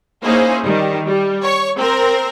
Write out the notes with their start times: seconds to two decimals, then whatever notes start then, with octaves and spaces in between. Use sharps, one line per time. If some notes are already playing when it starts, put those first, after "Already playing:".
0.24 A#3 C#4 D#4 E4 G#4 C5
0.64 D#3 G3
1.06 G3
1.43 C#5 C#6
1.78 C4 A#4 C5